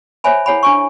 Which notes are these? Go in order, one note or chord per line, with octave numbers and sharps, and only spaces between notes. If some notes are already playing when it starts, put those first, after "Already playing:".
C5 C#5 E5 G#5 B5
E4 G#4 C#5 F#5 G#5 B5
D4 G#5 C#6